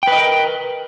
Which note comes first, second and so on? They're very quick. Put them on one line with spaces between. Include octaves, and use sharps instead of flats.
G5 B4 D#5 A#4